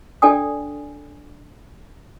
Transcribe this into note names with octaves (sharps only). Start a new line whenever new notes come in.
D4 A4 D5 G5 G#5 D#6